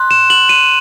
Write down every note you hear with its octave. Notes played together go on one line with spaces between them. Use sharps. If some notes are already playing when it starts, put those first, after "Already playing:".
Already playing: C6 F#6
E7
F#7
D#7